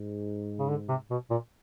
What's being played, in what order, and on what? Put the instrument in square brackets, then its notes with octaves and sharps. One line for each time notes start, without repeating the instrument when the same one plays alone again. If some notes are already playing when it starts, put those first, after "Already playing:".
Already playing: [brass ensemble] G#2
[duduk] C#3
D3
C3
B2
A#2